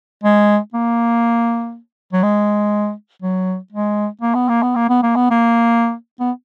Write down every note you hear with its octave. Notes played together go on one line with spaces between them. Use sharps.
G#3
A#3
F#3
G#3
F#3
G#3
A#3
B3
A#3
B3
A#3
B3
A#3
B3
A#3
B3